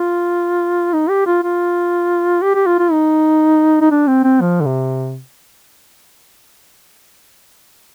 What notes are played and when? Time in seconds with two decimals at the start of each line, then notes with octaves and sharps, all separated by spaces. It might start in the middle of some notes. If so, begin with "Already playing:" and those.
Already playing: F4
0.93 D#4
1.09 G4
1.26 F4
1.43 F4
2.42 G4
2.55 G4
2.66 F4
2.79 F4
2.91 D#4
3.81 D#4
3.91 D4
4.07 C4
4.24 C4
4.41 F3
4.61 D3
4.65 C3